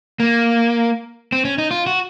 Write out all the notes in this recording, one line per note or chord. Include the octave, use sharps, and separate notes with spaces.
A#3
C4
C#4
D#4
F4
F#4